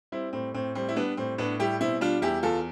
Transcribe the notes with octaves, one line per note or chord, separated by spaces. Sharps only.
G3 C4 E4
A2 C4
A2 C4
G3 C4
E4
G3 B3 D4
A2 C4
A2 B3 D4
G3 E4 G4
B2 C4 E4
G3 D4 F4
E2 E4 G4
E2 F4 A4